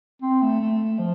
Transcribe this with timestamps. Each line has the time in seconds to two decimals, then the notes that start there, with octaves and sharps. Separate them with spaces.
0.22 C4
0.42 A3
0.61 A3
0.99 F3